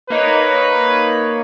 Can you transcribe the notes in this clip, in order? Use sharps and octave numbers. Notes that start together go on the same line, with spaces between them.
A#3 D#4 B4 C#5